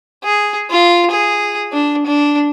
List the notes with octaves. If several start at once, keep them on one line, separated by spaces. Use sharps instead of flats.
G#4
F4
G#4
D4
D4